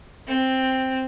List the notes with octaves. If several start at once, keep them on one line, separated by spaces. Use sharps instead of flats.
C4